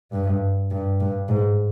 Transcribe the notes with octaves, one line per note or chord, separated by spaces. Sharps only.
G2
G2
G2
G#2